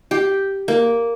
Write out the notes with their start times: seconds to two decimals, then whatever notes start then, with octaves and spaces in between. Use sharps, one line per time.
0.11 G4
0.68 A#3